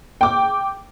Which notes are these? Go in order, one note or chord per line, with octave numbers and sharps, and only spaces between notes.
G5 D6